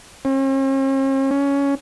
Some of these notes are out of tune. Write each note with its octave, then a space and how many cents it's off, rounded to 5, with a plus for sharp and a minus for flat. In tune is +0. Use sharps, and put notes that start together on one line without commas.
C#4 -45
C#4 +15